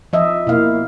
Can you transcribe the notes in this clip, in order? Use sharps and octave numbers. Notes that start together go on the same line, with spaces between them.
F3 D#5 E5
B2 A#3 E4 F5